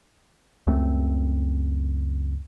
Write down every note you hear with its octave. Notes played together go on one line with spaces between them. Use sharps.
C#2 F#2 A3 C4